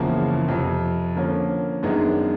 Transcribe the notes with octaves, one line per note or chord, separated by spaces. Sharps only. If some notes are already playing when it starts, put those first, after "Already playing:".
Already playing: F#1 E2 C#3 F3 A#3
F2 C3 F3
D3 F3 A#3 C#4
F#2 D#3 G#3 B3 D4